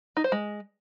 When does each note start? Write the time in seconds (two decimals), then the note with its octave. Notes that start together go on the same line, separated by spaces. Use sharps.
0.17 D#4
0.24 C5
0.32 G#3